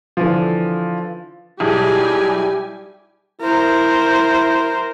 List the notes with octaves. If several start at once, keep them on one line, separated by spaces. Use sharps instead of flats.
D3 E3 F3
B1 G3 E4 G4 G#4 G#5
E4 A#4 C5